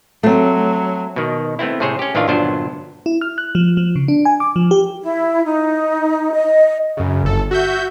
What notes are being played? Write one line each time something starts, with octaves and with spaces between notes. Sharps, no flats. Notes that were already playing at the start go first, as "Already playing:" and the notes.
F#3 A3 C4
B2 D#3
A3 B3 C4 E4
A2 C3 G#4 C5 C#5
C#4 G4
A1 D#3 E3 D4 F4 F5
G1 A#2 F#3 B3 D4 C5
E4
F6
F#6
F3
F3
C#3
D4
G#5
D6
F3
G4
E4
D#4
D#5
F#2 C#3
G1 A4
F#4 E5 G6